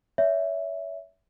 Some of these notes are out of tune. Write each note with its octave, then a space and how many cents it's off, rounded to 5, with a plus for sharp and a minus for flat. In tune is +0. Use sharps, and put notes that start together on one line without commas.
C#5 +35 E5 +0